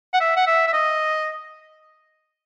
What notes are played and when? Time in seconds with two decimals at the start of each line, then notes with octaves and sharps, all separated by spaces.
0.14 F#5
0.21 E5
0.37 F#5
0.47 E5
0.67 E5
0.73 D#5